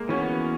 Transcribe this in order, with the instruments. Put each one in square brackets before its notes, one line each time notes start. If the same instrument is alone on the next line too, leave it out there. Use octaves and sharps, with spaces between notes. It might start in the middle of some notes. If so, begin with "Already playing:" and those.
Already playing: [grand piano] G#3 A#3
[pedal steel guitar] E3 B3 F#4 [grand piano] C#4